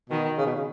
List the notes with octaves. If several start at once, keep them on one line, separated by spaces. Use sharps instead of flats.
B2 D#3
C#3
B2
C#3